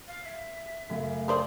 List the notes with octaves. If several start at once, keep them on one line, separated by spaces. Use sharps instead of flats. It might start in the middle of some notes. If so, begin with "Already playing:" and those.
F5
E5
F#2 C#3 A3
A#4 C5 D5 D#6